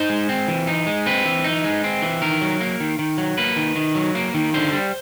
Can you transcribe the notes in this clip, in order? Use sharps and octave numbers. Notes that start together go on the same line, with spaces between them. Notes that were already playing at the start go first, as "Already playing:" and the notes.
Already playing: D#4 C5
G#3
C4
E3
D#4
G#3
C4 B4
E3
D#4
G#3
C4
E3
D#3 A#4
F#3
A#3
D#3
D#3
F#3
A#3 B4
D#3
D#3
F#3
A#3
D#3
D3 C5
G3